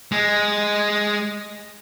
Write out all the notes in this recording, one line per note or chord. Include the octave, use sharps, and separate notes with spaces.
G#3